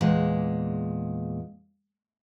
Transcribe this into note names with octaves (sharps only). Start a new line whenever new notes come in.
E2 A#2 G#3